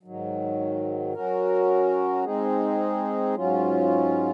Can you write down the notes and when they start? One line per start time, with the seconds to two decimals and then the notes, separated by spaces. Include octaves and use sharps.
0.03 G#2 D#3 F#3
1.14 F#3 C#4 F#4 A#4
2.25 G#3 C4 D#4 G#4
3.35 G#2 F#3 C#4 F4